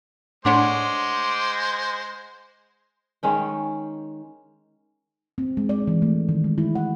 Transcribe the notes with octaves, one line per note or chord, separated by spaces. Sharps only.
A2 G#3 D4 C5 C#5 F#5 C6 D6
D#3 G#3 C#4 G5
C4
G#3
D5
E3
A3
D#3
G#3
E4
F#5